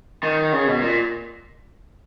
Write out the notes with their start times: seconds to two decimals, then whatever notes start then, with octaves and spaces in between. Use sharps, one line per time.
0.23 D#3
0.53 C#3
0.67 B2
0.82 A#2